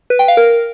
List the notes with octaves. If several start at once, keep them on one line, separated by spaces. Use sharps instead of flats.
B4
G5
F5
A#4